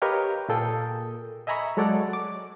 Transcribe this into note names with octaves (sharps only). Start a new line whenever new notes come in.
G4 A#4 B4 C#5 D#5 F5
A#2 A#3 G#4 A4 G5 D#6
D#5 E5 G#5 A#5 B5 C#6
F#3 G#3 A4 C#5 D5 F#5
D6